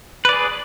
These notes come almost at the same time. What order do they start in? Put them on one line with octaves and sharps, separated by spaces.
B4 D5 G#4